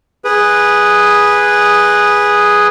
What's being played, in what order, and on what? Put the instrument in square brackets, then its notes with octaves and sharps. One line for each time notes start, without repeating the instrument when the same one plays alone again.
[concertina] G#4 B4